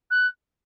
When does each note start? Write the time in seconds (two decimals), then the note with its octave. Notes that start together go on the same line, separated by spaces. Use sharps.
0.11 F#6